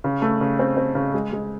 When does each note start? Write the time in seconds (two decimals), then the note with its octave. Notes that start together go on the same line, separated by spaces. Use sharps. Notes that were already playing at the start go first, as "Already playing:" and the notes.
0.04 C#3
0.22 A3
0.41 C#3
0.59 C4
0.77 C4
0.95 C#3
1.14 G#3
1.32 G#3